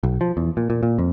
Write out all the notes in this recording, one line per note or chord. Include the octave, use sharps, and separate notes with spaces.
B1
F3
E2
A#2
A#2
A#2
F2